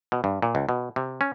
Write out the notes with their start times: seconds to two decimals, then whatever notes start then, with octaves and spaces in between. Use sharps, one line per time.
0.12 B2
0.24 G2
0.42 A#2
0.55 C#2
0.69 B2
0.96 C3
1.21 C#4